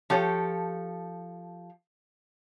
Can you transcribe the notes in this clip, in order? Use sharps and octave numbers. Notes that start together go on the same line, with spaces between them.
F3 G4 A4 C#5